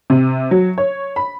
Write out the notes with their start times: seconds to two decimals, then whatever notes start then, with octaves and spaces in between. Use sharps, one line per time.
0.10 C3
0.51 F#3
0.78 C#5
1.16 B5